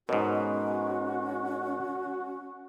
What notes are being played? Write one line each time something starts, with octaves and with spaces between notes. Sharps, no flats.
G#2 B2 C#4 F#4 A#4 C#5 D#5